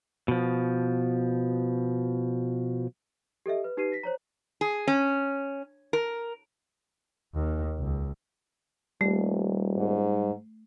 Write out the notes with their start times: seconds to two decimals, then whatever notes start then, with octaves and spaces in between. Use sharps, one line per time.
0.28 B2 F3
3.46 G4 A4 D#5 E5
3.64 B4
3.77 D#4 G4 B4 C7 D#7
3.92 A#6 B6
4.03 C5 C#5 A#5
4.61 G#4
4.88 C#4
5.93 A#4
7.35 D#2
7.79 C#2
9.01 D#1 G3 A3
9.77 G#2